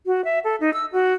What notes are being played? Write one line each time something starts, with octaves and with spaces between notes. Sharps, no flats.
F#4
E5
A4
D#4
E6
F#4